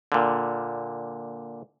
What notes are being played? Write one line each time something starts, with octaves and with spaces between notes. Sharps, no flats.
A#2 D3